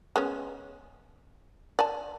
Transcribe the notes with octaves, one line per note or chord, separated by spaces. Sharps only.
G#3 B3 C#4
D5 G#5 A5